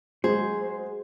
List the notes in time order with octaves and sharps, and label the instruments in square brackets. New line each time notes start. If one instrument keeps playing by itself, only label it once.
[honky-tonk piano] F#3 G#3 [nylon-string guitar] G#4 [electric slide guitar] C5